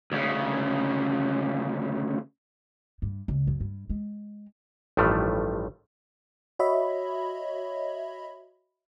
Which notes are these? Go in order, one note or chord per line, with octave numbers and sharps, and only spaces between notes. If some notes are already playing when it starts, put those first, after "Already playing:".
D2 C#3
G2
C#2
F#2
G2
G#3
A1 G2 D#3 F3 G3 A3
F#4 C#5 D#5 E5 B5